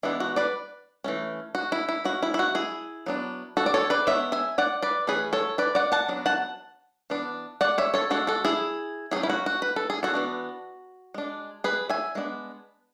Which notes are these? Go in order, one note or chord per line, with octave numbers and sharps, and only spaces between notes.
E3 G#3 B3 D4 E4
F#4
B4 D5
E3 A3 C#4
F#4
E4
E4
G#3 C#4 F#4
E4
E4
F#4
E4 G#4
F#3 B3 D4
F#4 A4
D5
A4 C#5
B4 D5
G#3 B3 D4 C#5 E5
E5 G#5
D5 F#5
B4 D5
E3 A3 C#4 G#4 B4
A4 C#5
B4 D5
D5 F#5
F#5 A5
F#3 B3 D4
F#5 A5
E3 B3 D4
D5 F#5
C#5 E5
A4 C#5
G#3 D4 F#4 A4
F#4 A4
E4 G#4
F#3 A3 C#4 E4 G#4
E4
F#4
F#4
B4
A4
G#4
F#4 A4
E3 B3 D4
G#3 D4
G#4 B4
E5 G#5
G#3 B3 D4